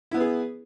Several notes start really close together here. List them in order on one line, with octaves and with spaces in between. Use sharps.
E4 B3 B4 G#4